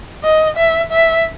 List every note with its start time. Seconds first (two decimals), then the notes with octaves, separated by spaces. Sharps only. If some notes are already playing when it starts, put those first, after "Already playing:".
0.23 D#5
0.57 E5
0.92 E5